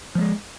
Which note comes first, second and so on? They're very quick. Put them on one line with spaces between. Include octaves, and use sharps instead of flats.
F3 A3 G#3